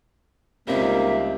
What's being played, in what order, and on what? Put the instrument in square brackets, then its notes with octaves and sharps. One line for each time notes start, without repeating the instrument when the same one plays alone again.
[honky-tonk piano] C#2 C4 [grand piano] G3 D#4 [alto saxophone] A#3 [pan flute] E5